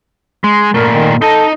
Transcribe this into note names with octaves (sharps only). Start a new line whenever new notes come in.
G#3
A#2 A3 A#4
D#3
D#4 A4 D#5